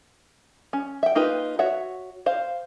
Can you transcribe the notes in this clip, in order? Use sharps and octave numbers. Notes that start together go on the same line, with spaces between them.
C#4
E5 G5
A#3 D#4 F4 G4 B4
F#4 C#5 E5 F#5
C5 F5